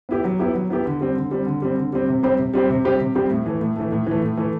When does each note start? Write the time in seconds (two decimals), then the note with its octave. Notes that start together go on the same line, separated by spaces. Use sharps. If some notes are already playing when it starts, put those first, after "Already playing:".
0.09 B3 E4 G4
0.24 F#3
0.39 B3 E4 G4
0.54 F#3
0.70 B3 E4 G4
0.85 D3
1.01 G3 C4
1.16 D3
1.31 G3 C4
1.46 D3
1.62 G3 C4
1.77 D3
1.93 G3 C4
2.09 C3
2.23 G3 C4 G4 C5
2.39 C3
2.54 G3 C4 G4 C5
2.69 C3
2.85 G3 C4 G4 C5
3.00 C3
3.15 G3 C4 G4 C5
3.31 A2
3.46 E3 A3
3.61 A2
3.76 E3 A3
3.92 A2
4.07 E3 A3
4.22 A2
4.37 E3 A3